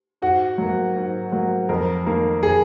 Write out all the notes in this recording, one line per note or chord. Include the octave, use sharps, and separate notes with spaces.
G#2 F#4
F#3 A#3
G#2
F#3 A#3
F2 A#4
D#3 A#3
G#4